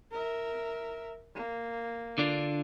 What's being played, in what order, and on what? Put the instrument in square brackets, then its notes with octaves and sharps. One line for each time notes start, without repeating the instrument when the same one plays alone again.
[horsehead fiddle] A#4 E5
A#3
[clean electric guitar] D3 D4 F4